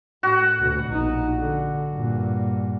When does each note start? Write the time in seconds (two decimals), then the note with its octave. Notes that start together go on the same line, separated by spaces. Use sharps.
0.23 A2 F#4
0.59 D2 B2
0.88 A#1 D#4
1.38 D3
1.92 G2 A#2